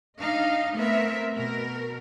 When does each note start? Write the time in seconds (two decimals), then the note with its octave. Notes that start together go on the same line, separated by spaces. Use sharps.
0.20 D4 D#4 D#5 F5
0.75 A3 B3 C4 A#4 E5
1.34 B2 A#4